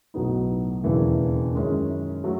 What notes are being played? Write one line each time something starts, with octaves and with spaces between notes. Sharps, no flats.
B1 A2 F#3 B3 D#4
E1 D#2 C#3 E3
F#2 D#3 G#3 C#4 E4
F#3 A3